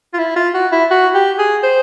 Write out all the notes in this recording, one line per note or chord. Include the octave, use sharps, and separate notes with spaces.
F4
E4
F4
F#4
E4
F#4
G4
G#4
C5